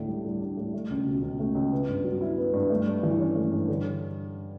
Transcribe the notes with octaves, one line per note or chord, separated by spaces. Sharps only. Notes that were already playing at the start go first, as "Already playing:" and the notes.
Already playing: D2 A2 D4
G3
A2
D4
A2
A3
C#2
B2
C#2
A3
C#2
B3
G2
F#3
E4
B3
G2
A3
G2
E3
C#4
A3
G2
D3